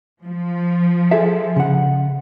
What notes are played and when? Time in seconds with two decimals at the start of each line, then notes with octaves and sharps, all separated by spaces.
0.24 F3
1.11 G#4 A4 E5
1.56 C#3 F#5